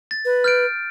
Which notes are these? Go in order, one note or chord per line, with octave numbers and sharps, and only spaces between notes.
A6
B4
F6 G6 D7